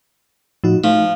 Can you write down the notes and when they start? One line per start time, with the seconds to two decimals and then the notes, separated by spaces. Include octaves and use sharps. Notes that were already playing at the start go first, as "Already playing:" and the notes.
0.64 A2 F3 D#4 F#4
0.84 F3 A3 D#4